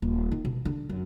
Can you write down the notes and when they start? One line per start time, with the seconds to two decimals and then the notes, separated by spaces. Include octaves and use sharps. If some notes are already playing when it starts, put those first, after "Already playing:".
0.02 D#1
0.32 D#3
0.45 B2
0.65 D3
0.89 F#2